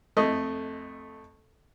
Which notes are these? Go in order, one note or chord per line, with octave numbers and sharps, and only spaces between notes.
F2 A3 D#5